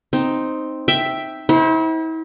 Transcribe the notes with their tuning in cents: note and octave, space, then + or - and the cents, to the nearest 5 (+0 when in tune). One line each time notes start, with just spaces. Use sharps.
C4 +0 D#4 +0
E5 +0 G5 +0
E4 -40 C5 +0 F#5 +40